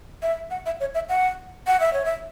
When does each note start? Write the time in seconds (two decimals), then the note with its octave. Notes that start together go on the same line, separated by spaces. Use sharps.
0.22 E5
0.51 F#5
0.66 E5
0.80 C#5
0.95 E5
1.09 F#5
1.67 F#5
1.80 E5
1.93 C#5
2.05 E5